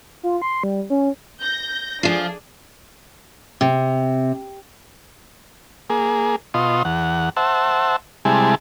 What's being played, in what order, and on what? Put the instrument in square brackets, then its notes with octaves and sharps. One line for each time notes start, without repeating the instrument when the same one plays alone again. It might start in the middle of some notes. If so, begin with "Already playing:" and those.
[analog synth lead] F4
C6
G3
C#4
[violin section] G6 A#6
[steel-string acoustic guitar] F3 F4 [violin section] D4 G#4
[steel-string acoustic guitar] C3
[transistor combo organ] A#3 G#4
B2 F4 D#5 C6
E2 F#5
C5 E5 F#5 A5
C3 G3 G#3 E4 G#5 A5